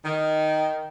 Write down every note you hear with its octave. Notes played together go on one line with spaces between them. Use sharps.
D#3